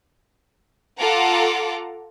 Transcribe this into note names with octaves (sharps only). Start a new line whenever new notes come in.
F4 A4 F#5 A#5 D6